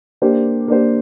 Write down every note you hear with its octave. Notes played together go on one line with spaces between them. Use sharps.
A#3 D4 G4 C5
A#3 D4 G4 C5